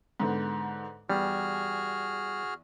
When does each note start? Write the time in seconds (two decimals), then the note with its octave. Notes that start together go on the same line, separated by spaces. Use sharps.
0.20 G#2 D3 B3
1.10 E2 G3 F#4 G#4 F6